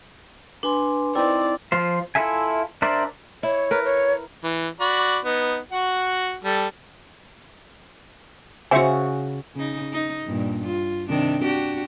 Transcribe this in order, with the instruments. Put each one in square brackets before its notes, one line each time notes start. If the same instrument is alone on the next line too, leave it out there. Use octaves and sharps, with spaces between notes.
[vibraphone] D4 G#5 C6 [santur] B4
[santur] C4 D#4 [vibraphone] E4 [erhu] D5
[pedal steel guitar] F3 F4 C5
E4 F4 A4 E5 G#5
D4 A#4 C5 D5 E5
[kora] E4 [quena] C#5
[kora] A#4 B4
[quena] C#5
[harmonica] E3
F#4 D5 B5
B3 D#4
F#4 F#5
G3 A4
[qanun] C#3 F#4 [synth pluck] C5 E5 C#6 [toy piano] G#5
[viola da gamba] C#3 D#4
D#4
G2 A#2
F4
C3 D#3 D4
D4 F#4 G4